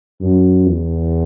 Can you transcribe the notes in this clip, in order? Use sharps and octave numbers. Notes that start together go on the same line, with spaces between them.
F#2
E2